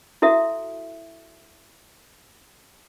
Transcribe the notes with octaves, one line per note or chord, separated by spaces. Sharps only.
E4 F#4 A4 E5